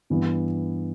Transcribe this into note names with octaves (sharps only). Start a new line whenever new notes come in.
G2 E3 B3